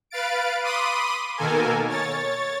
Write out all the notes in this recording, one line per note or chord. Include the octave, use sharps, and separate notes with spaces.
B4 F5 A6 D7
B5 C6 D6 D#6 D#7
B2 D#3 A#3 A4 A#4 G#5
C#5 A6